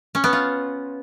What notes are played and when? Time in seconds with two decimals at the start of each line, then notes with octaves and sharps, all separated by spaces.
0.15 C#4
0.24 B3
0.33 F4